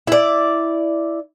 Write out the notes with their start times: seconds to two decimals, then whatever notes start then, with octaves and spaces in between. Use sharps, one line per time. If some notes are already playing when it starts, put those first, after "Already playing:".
0.07 E4 D5